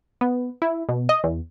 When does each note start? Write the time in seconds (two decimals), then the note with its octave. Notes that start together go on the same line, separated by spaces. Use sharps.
0.21 B3
0.62 E4
0.89 B2
1.09 D#5
1.24 E2